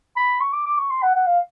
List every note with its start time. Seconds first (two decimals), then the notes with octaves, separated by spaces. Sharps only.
0.16 B5
0.41 C#6
0.53 D6
0.66 D6
0.78 C#6
0.91 C6
1.03 F#5
1.15 F#5
1.27 F5